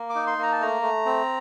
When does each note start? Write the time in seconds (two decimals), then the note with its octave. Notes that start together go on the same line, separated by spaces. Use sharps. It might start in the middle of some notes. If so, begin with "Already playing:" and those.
Already playing: A#3
0.10 D6
0.15 D#4
0.27 C6
0.38 A#3 A#5
0.52 A5
0.60 A3 A#5
0.82 A3
1.05 C4